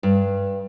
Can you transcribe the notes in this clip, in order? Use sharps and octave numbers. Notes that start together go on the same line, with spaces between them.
G2